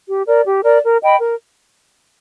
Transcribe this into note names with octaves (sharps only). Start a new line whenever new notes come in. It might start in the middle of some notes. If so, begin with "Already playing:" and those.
G4
A#4 D5
G4
A#4 D5
A#4
D#5 G5 B5
A#4